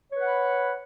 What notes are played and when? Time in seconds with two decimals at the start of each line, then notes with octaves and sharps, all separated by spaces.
0.11 C#5
0.16 B4
0.21 F#5
0.26 B5